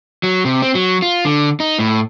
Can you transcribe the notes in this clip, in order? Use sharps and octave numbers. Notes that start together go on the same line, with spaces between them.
F#3
C3
C4
F#3
F4
D3
D#4
A2